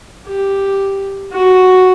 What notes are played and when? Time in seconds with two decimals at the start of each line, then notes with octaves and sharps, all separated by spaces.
0.27 G4
1.33 F#4